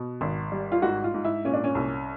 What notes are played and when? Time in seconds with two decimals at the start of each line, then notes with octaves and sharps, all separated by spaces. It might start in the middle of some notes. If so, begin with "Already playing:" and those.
Already playing: B2
0.21 G#1
0.52 G3
0.72 F4
0.82 G#2 F#4
1.04 F4
1.14 G#2
1.25 E4
1.45 A#2 C#4
1.54 D4
1.64 C#4
1.75 C2